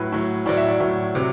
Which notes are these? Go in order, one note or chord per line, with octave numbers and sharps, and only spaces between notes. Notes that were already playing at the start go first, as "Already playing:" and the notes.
Already playing: A2 F#3 B4
A2 F#3
A2 F#3 D5
E5
D5
A2 F#3
C3 F#3